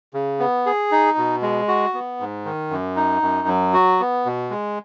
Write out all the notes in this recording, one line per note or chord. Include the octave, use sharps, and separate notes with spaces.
C#3
B3
G#4
D#4
B2
G#3
F#4
B3
G#2
D#3
F#2
D#4
F#2
F#3
F#4
B3
B2
G#3